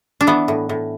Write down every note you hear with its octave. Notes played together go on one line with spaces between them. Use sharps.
D4
E3 B3
A2
A2